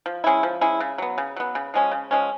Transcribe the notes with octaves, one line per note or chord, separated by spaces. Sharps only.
F3
G#3 C#4 E4
F3
G#3 C#4 E4
C#3
F#3 B3
C#3
F#3 B3
C#3
F3 G#3 C#4
C#3
F3 G#3 C#4